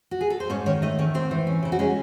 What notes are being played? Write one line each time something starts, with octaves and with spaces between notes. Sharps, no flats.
F#4
G#4
A4
C5
G#2 C#4 C#5
D#3 C#4 C#5
A3 D#4 D#5
D#3 C#4 C#5
G#2 C4 C5
E3
C#4
C#3 E4
F#4
G#3 C#4 G#4